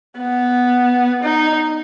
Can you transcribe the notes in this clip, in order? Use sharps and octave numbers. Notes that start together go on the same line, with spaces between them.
B3
D#4